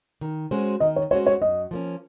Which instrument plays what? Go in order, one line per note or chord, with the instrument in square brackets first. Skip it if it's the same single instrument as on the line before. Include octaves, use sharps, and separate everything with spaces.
[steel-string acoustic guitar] D#3
G#3 C#4 F#4 C5
[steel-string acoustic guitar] D#3 [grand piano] D#5
[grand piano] C#5
[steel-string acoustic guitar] G#3 C#4 F#4 C5 [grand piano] C#5
[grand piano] C#5
[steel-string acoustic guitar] F#2 [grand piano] D#5
[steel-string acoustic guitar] F3 A#3 C#4